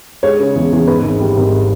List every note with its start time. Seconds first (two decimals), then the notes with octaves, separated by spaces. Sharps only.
0.23 G#3 C#5
0.40 C#3
0.55 E2
0.72 E2
0.87 G#2 B4
1.04 G#1
1.20 G3
1.37 G#1